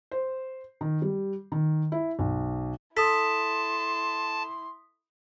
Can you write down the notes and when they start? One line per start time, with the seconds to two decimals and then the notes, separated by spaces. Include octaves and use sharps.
0.11 C5
0.81 D#3
1.02 G3
1.52 D#3
1.92 E4
2.19 B1
2.97 E4 A4 A5 C6 D#6 B6